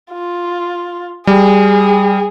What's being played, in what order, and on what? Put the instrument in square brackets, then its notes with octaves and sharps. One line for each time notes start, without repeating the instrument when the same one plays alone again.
[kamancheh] F4
[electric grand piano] G3 [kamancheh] G#4